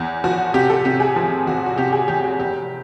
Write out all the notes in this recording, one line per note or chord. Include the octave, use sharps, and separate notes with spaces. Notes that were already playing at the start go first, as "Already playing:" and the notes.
Already playing: E2
F3 F#4
C3 G4
A4
C3 G4
G#4
F3
E2 F#4
F#4
C3 G4
G#4
E2 G4
F#4
F1 G4